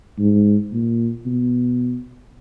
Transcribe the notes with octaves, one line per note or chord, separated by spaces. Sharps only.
G#2
A#2
B2